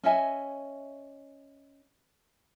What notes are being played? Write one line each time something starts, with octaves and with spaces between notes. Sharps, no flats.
C#4 D#5 E5 G#5